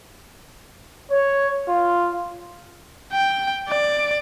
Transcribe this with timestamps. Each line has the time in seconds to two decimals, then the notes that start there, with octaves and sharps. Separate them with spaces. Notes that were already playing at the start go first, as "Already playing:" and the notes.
1.11 C#5
1.68 F4
3.12 G5
3.69 D5